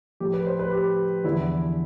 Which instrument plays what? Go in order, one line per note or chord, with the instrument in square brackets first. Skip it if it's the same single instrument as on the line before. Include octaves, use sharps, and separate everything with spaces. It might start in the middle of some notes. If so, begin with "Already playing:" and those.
[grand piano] A2 F3 G4
B4
C5
B4
G4
E2 D3 F3 E4